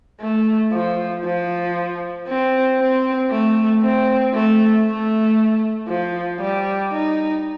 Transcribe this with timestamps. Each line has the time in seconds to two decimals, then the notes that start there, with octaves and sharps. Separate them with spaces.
0.20 A3
0.72 F3
1.24 F3
2.27 C4
2.79 C4
3.30 A3
3.83 C4
4.34 A3
4.85 A3
5.88 F3
6.40 G3
6.92 D#4